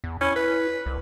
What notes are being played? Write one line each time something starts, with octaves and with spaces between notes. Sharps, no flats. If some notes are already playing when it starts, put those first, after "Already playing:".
E2
C#4 E4
B4
C2